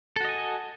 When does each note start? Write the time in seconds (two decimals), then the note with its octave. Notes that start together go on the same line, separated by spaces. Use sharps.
0.16 A4
0.21 F#4
0.25 D#5
0.29 G#5